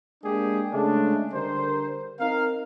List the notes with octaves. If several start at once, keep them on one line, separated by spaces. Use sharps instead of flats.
G#3 A#3 D4 G4 G#4
C#3 G#3 A3 D4
D3 G3 A#4 C5
C4 D#4 A#4 F5